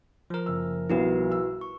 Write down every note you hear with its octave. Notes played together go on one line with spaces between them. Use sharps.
F3 A#4
F#1 E6
B1 G3 B3 E4 F#4 B4
E6
C#6